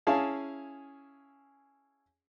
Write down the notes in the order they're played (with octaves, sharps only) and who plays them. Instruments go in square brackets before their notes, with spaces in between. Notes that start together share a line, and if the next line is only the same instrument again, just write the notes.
[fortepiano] C#4 E4 G#4 F5 A5